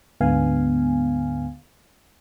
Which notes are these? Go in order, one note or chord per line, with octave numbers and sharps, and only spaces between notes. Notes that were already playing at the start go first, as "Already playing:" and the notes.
D2 G#2 D3 B3 F5 G#5